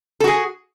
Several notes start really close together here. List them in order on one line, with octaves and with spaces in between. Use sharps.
A4 F#4 G#4